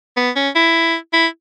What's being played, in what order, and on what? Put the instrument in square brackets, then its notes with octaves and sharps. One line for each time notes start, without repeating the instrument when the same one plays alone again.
[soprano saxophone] B3
C#4
E4
E4